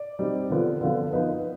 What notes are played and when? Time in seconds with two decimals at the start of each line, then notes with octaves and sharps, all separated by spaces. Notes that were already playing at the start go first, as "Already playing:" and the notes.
Already playing: D5
0.19 G3 C4 D#4
0.50 D3 F3 B3 F4
0.81 D3 F3 B3 F4
1.13 F3 B3 D#4 B4